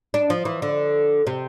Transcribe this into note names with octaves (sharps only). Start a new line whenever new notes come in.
D4
F3
E3
D3
C3